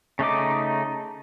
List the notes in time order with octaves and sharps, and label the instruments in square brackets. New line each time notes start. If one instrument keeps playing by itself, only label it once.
[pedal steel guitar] C#3 A3 D#4 D6